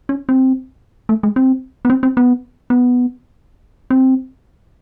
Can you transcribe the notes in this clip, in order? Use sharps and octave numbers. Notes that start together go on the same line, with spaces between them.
C#4
C4
A3
G#3
C4
B3
C4
C4
B3
B3
C4